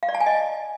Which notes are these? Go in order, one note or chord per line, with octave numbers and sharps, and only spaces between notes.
F5
D5
A5
G#5
D#5